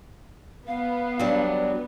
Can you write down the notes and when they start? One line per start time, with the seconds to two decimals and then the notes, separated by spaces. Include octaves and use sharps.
0.67 B3 F5
1.19 F#3 G3 D4